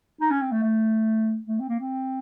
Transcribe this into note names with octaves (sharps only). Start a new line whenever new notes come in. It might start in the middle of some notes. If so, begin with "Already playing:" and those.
D#4
C#4
C4
A3
A3
A3
C4
A#3
C4